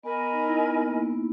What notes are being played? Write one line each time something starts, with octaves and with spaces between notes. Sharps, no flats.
B3 A#4 D#5 G#5 B5
D#4
E4
B3
A#3
B3